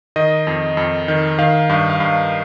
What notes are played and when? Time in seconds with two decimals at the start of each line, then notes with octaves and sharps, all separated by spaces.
0.16 D#3 D#5
0.47 F2
0.77 F2
1.08 D#3
1.39 D#3 F5
1.69 G2 F5
1.90 F5
2.00 G2 F5